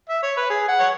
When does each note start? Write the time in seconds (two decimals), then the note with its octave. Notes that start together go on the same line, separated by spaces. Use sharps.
0.09 E5
0.23 C#5
0.37 B4
0.50 G#4
0.68 F#5
0.79 C#5